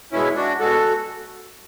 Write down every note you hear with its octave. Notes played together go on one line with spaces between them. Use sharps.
B2 G#3 C#4 E4
D4 F#4
B2 G#3 F#4 A4